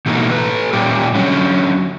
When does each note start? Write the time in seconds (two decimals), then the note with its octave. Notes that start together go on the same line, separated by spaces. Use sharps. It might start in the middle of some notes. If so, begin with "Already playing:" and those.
0.06 B2 E3 A3 A#3 D#4
0.31 A4 B4
0.73 A#2 G3 C#4 G4
1.15 D3 F#3 C#4